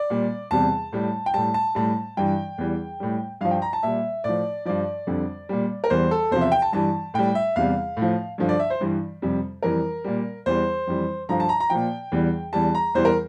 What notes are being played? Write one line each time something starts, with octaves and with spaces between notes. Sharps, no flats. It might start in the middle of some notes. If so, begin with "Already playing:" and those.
Already playing: D5
A#2 G3
E2 C3 G3 A5
A2 G3
G5
A2 G3 A5
A5
A2 G3 A5
G2 E3 G3 G5
E2 E3 G3
A2 G3
G2 F3 F5
G5
A#5
A5
A#2 G3 E5
A2 F3 D5
G2 F3 D5
F2 D3 G3
A#2 G3
A#4
E2 E3 G3 C5
A4
E2 C3 F3 C5
E5
G5
A5
G2 E3 G3 A5
A2 G3 G5
E5
E2 C3 G3 F5
A2
F3
G2 D3 F3
D5
E5
C5
G2 E3 G3
F2 C3 G3
F2 E3 G3 A#4
A#2 G3
E2 E3 G3 C5
F2 E3 G3
G2 D3 F3 A#5
A5
A#5
A#5
A#2 F3 G5
E2 E3 G3
E2 E3 G3 A5
A#5
E2 E3 G3 C5
A#4